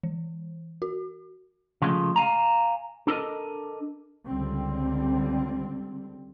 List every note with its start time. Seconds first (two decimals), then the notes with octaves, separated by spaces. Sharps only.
0.03 E3
0.82 F#4
1.82 C#3 F3 G#3 A3
2.16 F5 G#5 A#5
3.07 D4 A4 A#4 D#5
4.26 C#2 D3 G3 C4